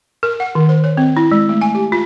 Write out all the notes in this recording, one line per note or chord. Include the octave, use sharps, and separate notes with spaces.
A#4
F#5
D#3
C5
C#5
C4
E4
G#3
A3
G#5
G4
F4